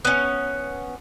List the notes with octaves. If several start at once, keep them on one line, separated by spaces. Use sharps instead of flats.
B3 C#4